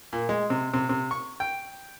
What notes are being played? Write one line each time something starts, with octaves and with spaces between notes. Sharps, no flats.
A#2
G#3
C3
C3
C3
C#6
G5